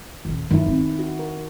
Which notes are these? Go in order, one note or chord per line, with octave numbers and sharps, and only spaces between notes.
D#1 D#3
G2 D#3 F#3 E4
B3 C4
F#4
A#4